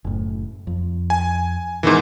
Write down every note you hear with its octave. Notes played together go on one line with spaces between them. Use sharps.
F#1 A2
F2
G#5
G#2 B2 D#3 E3